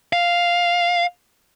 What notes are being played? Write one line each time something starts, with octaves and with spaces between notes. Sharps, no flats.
F5